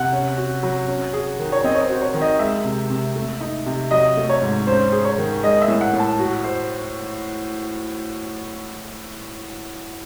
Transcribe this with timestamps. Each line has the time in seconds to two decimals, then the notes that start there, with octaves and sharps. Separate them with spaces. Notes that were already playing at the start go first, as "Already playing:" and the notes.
Already playing: C3 F#5
0.13 C#4
0.37 F#4
0.63 F#3
0.88 C#4
1.13 G#4
1.39 D#3
1.52 C#5
1.64 C4 D#5
1.75 C#5
1.82 C5
1.90 F#4
2.02 C#5
2.14 D#3
2.21 D#5
2.39 G#3 E5
2.65 C3
2.90 C3
3.16 A3
3.41 D#4
3.66 C3
3.91 F#3 D#5
4.17 A3
4.29 C#5
4.42 G#2
4.67 C#4 C5
4.92 G#4
5.05 C#5
5.18 D#3
5.43 G#3 D#5
5.62 E5
5.68 A2
5.81 F#5
5.94 A2
6.00 A5
6.19 F#4
6.44 C5